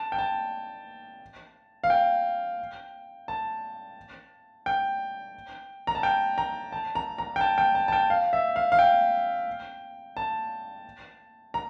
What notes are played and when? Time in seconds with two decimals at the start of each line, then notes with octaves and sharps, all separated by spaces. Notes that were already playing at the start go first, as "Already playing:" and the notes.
Already playing: A5
0.12 G5
0.19 A5
1.84 F5
1.90 G5
3.28 A5
4.66 G5
5.87 A#5
5.95 A5
6.03 G5
6.38 A#5
6.72 A5
6.95 A#5
7.18 A#5
7.36 G5
7.41 A5
7.58 G5
7.75 A5
7.88 A5
7.92 G5
8.10 F5
8.33 E5
8.56 F5
8.72 F5
8.79 G5
10.17 A5
11.54 A#5